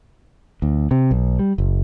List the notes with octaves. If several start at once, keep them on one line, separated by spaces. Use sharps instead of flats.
D2
C3
B1
G3
F#1